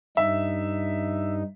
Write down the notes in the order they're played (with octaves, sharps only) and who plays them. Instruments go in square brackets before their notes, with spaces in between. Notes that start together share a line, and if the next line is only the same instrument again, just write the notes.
[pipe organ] G2 D#4 [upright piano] E5